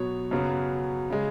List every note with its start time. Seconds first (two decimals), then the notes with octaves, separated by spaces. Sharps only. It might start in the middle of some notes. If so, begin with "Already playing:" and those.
Already playing: B2 F#3 B3 C#5
0.31 F#2 C#3 F#3 B3
1.10 C#3 G#3